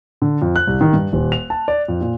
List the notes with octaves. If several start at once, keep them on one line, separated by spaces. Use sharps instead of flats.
D3
F2
F#6
C2
D#3
G2
D#1
F7
A5
D5
F2
A#2